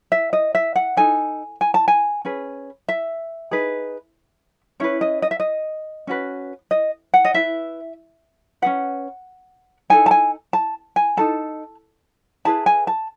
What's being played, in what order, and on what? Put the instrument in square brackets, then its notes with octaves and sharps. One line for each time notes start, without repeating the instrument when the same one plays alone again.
[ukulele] E5
D#5
E5
F#5
D#4 A4 G#5
G#5
A5
G#5
C#4 G#4 B4
E5
D#4 G#4 B4
C#4 E4 B4 C#5
D#5
D#5
E5
D#5
C#4 F#4 B4
D#5
F#5
D#5
E4 B4 E5
C#4 G#4 B4 F#5
D#4 A4 G#5
A5
G#5
A5
G#5
D#4 F#4 A4 A5
E4 G#4 B4 A5
G#5
A5